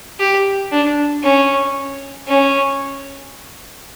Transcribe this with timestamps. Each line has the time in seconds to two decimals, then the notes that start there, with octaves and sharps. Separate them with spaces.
0.20 G4
0.72 D4
1.23 C#4
2.27 C#4